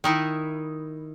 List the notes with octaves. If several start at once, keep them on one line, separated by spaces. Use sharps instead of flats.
D#3 D#4 E4